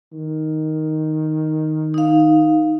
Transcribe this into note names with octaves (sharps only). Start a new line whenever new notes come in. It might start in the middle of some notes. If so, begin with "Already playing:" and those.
D#3
D#4 F5